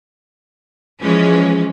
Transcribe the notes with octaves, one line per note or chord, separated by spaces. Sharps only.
E3 F3 G#3 C#4